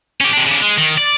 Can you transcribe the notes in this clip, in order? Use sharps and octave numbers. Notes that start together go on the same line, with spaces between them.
C#4 G4
C3 D4
C#3 D4
G#3
D#3
D5